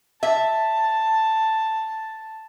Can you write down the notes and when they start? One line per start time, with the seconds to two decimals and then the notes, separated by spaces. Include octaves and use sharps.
0.23 E5 A5